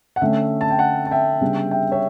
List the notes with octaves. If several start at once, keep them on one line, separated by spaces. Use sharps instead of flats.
F#5
D3 A3 C#4 E5 G5
A5
G5
F#5 A5
A5
E5 G5
C#3 G3 B3 D4
E5 G5
C#5 E5